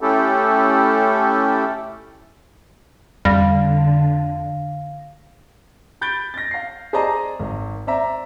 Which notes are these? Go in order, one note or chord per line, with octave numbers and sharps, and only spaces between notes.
A3 C#4 E4 G4 A4
F2 D3 G3 F5 A#6
B5 G6 A6 D7 G7
A6 A#6
F5 C7
G#4 C5 D5 D#5 A5 A#5
G#1
C5 D5 E5 A#5